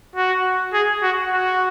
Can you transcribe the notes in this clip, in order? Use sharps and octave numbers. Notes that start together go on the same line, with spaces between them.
F#4
G#4
F#4
F#4